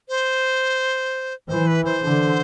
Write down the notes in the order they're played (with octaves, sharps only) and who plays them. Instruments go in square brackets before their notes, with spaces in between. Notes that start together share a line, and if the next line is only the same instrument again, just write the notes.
[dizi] C5
[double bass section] E3 [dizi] C5
[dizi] B4
C5
[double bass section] D3